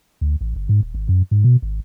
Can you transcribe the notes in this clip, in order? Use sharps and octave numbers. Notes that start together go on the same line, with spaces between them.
D2
A1
G1
G#2
D#1
G#1
F#2
G#2
B2
G#1